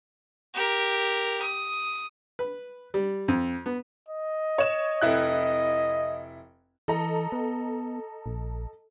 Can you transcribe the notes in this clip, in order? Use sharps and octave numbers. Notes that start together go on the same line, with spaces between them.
G4 A#4
D#6
B4
G3
F2
B3
D#5
C#5 E7
F1 E4 F#6
E3 A4 D#5 A#5
B3
A#1